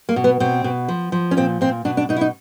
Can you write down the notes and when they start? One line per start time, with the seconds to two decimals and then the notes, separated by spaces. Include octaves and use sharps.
0.09 A#3
0.16 B2
0.24 B3
0.40 B2 C4
0.64 B2
0.89 F3
1.12 F3
1.31 C#4
1.37 A#2 C4
1.61 A#2 C4
1.85 B2 D4
1.97 D4
2.09 B2 D#4
2.16 E4
2.21 D#4